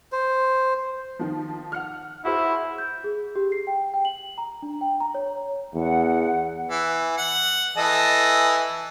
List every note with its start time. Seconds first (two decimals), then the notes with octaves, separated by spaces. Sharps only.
0.12 C5
1.19 D#3 F3
1.72 F#5 F6
2.25 E4 F#4 G#4 C5
2.78 G6
3.04 G#4
3.36 G4
3.52 C7
3.67 G5
3.94 G5
4.05 F#7
4.38 A#5
4.63 D4
4.81 G5
5.00 A#5
5.15 C#5
5.74 E2 F#5
6.69 E3
7.17 F#5
7.77 E3 A4 D#5